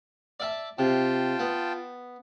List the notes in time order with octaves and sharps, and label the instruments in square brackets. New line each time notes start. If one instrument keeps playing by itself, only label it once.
[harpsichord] D5 E5 A5
[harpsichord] C3 [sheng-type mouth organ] F4 G5 A5
[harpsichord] B3